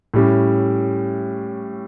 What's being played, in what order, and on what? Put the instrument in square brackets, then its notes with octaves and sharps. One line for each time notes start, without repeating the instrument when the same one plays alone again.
[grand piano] A2 G3 C#4